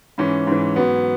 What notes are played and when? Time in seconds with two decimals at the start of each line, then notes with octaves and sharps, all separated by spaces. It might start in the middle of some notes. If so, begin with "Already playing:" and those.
0.18 G#2 E3 C#4
0.47 G#2 E3
0.76 G#2 F#3 B3